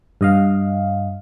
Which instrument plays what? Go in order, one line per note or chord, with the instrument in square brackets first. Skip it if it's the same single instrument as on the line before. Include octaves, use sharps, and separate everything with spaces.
[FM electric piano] G2 D#5 F5